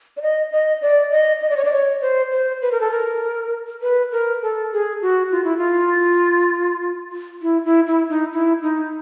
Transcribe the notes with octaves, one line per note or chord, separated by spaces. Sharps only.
D5
D#5
D#5
D5
D#5
D#5
D5
C#5
D5
C#5
C5
C5
B4
A#4
A4
A#4
B4
A#4
A4
G#4
F#4
F4
E4
F4
E4
E4
E4
D#4
E4
D#4